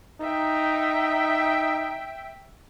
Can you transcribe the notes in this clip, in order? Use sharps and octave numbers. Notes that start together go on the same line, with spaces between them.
D#4 E5 G5